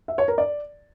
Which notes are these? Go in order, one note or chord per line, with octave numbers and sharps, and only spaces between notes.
E5
C#5
A#4
D5